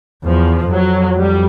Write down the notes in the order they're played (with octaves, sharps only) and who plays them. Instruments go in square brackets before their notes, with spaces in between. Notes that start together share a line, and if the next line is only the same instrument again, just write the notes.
[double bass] E2 [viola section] F3
[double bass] F2 [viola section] F#3
[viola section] G3